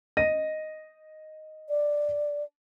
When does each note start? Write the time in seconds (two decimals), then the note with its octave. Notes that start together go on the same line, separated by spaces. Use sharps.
0.17 D#5 A#6 D#7
1.69 D5